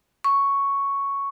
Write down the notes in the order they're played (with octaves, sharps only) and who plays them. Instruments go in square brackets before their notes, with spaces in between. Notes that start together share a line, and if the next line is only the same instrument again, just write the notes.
[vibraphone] C#6